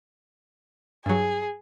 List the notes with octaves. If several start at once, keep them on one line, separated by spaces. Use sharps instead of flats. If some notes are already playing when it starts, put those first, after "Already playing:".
G2 F#3 G#4